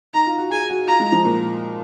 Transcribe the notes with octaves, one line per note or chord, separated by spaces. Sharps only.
D#4 A#5
F4
F#4
G#4 G#5
F#4
F4 A#5
G#3
F3
A#2